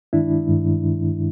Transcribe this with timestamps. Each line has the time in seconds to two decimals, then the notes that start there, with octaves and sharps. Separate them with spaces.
0.13 G2 D#3 G#3 D4 E4
0.48 G2 D#3 G#3